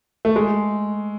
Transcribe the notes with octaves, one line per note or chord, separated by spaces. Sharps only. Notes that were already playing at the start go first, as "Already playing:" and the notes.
A3
G#3